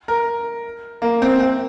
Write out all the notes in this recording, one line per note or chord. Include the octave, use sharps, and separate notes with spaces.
A#4
A#3
C4
C4